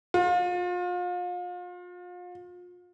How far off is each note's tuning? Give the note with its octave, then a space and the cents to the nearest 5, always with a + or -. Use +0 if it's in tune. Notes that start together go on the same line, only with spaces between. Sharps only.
F4 +35